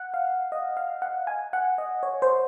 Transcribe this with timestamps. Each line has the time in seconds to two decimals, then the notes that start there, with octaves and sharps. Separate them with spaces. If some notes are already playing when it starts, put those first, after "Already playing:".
Already playing: F#5
0.14 F5
0.52 D#5
0.77 F5
1.02 F#5
1.27 G#5
1.53 F#5
1.78 D#5
2.03 C#5
2.22 C5